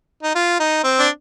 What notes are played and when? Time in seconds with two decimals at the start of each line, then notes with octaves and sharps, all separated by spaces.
0.23 D#4
0.35 F4
0.60 D#4
0.84 C4
0.99 D4